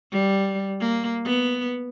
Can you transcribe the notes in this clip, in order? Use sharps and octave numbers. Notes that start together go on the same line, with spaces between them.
G3
A#3
B3